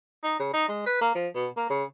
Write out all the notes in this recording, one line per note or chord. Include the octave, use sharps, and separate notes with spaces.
D#4
C#3
D#4
G#3
B4
A#3
F3
B2
A#3
C#3